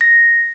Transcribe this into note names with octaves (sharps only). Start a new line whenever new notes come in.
A#6